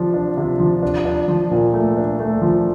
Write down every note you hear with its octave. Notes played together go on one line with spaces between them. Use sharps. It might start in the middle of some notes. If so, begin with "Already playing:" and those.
Already playing: C3 F3 D4
D4
C3
F3
D4
D4
F3
A#2
A3
D4
A3
F3